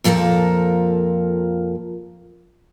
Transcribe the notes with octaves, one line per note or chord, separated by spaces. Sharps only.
F2 A#2 F3 A4 A#4